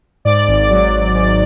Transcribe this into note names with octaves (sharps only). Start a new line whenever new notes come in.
G#2 D5
G#1
F#3
G#2
G#2